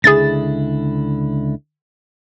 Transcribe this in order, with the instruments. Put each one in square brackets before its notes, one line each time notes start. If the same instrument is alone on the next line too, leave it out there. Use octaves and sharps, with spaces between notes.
[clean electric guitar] C#2 D3 E4 [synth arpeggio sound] G#4 A6